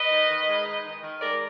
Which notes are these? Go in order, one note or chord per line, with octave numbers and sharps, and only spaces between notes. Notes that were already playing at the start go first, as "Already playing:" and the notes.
Already playing: B4 D#5
D#3
D#3
G#3
D#4
D#3
D#3
G#3 A#4 D5